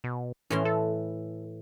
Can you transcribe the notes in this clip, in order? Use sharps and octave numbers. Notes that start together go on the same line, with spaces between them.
B2
A2 E3 C#4 C6
A4